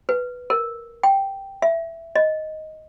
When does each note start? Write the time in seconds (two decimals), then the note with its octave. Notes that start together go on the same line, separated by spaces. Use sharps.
0.09 B4
0.50 A#4
1.03 G5
1.62 E5
2.16 D#5